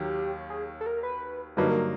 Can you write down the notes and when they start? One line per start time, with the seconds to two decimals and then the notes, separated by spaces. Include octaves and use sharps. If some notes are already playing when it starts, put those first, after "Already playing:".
Already playing: D#2 D#3 F#3 G4
0.50 G#4
0.81 A4
0.86 A#4
1.03 B4
1.57 G2 D3 F#3 A#3 D#4 B4
1.71 A#4